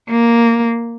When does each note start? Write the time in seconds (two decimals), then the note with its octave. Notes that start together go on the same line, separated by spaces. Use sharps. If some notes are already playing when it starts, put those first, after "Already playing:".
0.10 A#3